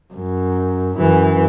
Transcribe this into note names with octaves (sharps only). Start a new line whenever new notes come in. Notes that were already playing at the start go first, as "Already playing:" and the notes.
F#2
F#2 E3